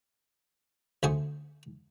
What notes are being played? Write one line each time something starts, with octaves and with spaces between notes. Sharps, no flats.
D2 A3 C5 G#5 C#6 D#6